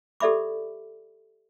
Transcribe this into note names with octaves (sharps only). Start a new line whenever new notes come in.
G4 A4 D5 E5 B5 D6